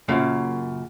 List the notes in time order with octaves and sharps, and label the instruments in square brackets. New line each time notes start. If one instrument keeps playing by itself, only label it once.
[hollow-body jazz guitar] F#2 A#2 C#3